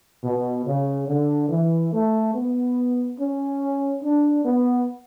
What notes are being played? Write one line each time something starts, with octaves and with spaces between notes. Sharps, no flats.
B2
C#3
D3
E3
A3
B3
C#4
D4
B3